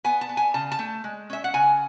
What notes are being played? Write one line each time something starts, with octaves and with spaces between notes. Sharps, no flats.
B3 G#5
A5
B3
G#5
C#3 A5
A5
A3
G#3
C#4 E5
F#5
C#3 G#5